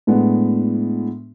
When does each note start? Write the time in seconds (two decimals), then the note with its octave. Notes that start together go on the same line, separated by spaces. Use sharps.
0.07 A2 G#3 B3 D4